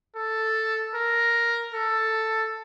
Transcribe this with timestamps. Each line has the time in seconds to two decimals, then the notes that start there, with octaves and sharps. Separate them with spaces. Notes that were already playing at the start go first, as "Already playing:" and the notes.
0.16 A4
0.94 A#4
1.74 A4